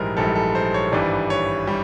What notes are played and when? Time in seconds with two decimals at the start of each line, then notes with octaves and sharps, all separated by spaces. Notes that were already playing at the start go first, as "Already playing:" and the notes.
Already playing: A#1 G#2 E3 G3 A#4 C5
0.17 A#1 G#2 E3 G3 A4
0.35 A4
0.55 C5
0.74 C#5
0.92 G#1 G2 E3 G3 D5
1.30 C#5
1.67 G3